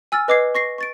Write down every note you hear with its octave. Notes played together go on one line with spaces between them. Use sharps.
G#5 E6 F6 A6
B4 D#5 D6 G#6 C7
C#6 A#6 C7
C#6 A6 D7